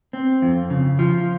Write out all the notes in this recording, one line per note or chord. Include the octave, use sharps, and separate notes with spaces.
C4
F2
C#3
F3